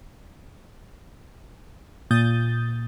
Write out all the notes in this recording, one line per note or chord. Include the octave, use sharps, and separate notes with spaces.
A#2 D#6 G6 A6